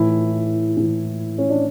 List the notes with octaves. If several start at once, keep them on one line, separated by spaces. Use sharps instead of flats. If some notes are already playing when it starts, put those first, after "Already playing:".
Already playing: A2 E3 E4
A2 E3
C#4
D4